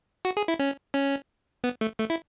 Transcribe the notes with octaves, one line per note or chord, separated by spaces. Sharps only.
F#4
G#4
E4
C#4
C#4
B3
A3
A3
E4